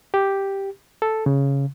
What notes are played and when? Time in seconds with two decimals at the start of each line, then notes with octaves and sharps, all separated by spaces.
0.14 G4
1.02 A4
1.26 C#3